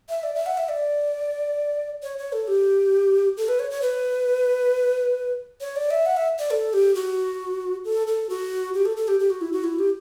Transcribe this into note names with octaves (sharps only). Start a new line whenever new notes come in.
E5
D5
E5
F#5
E5
D5
C#5
C#5
A4
G4
A4
B4
C#5
C#5
B4
C#5
D5
E5
F#5
E5
D5
A4
G4
F#4
A4
A4
F#4
G4
A4
A4
G4
G4
F#4
E4
F#4
E4
G4